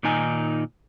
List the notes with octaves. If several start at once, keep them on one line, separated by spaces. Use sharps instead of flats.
A#2 D#3 D#4 G#5